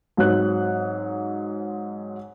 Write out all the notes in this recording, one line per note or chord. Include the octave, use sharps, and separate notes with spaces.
G#2 F#3 C4 C#5 F#6